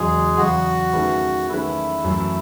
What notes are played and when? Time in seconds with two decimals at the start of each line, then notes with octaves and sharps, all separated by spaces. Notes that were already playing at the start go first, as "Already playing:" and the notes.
Already playing: E2 C#3 F#3 G#3 G#4
0.37 E2 C#3 F#3 F#4
0.93 D#3 A3 C#4 G#4 B4
1.49 D#3 A3 C#4 E4 G#4 B4
2.04 F#2 E3 A3 C#4